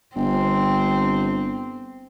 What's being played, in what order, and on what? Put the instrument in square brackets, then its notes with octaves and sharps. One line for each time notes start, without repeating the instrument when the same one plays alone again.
[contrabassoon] G1 [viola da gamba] C4